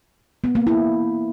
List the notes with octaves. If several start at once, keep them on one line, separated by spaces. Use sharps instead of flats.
B3
A#3
E4